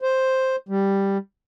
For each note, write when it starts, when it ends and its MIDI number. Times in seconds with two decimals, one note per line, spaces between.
0.02 0.56 72
0.69 1.18 55